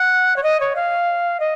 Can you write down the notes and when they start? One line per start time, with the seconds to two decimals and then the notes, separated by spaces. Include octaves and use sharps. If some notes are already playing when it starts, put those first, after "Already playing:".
Already playing: F#5
0.36 C#5
0.43 D#5
0.60 C#5
0.76 F5
1.40 D#5